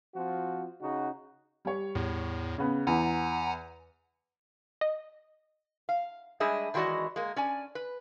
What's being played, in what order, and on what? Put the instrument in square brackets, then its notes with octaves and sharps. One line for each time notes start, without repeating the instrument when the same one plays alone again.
[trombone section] F3 C4 F4 F#4
C#3 D#4 F#4
[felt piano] G3 C#5
[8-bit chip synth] E2 A2
[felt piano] C#3 B3
[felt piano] E2 [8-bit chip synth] F#5 G#5 A#5
[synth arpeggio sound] D#5
[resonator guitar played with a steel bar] F5
G3 G#3 D4 G#4 D#5 E5
D#3 E3 G#3 F#4 D5 D#5
G#3 A#3
C#4 D5 G#5
B4